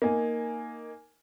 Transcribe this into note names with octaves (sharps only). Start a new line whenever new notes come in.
A#3 D#4 G#5